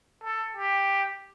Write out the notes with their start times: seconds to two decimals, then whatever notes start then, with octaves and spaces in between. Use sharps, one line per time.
0.23 A4
0.57 G4